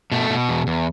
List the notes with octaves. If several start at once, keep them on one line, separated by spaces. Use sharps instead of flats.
B2 A3
B2
E2
E2